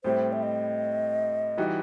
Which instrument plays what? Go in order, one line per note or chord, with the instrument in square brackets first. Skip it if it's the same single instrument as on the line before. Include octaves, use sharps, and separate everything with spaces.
[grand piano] A2 G3 C4 E4 [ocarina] C5
[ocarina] E5
D#5
[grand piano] E3 G3 D#4 F#4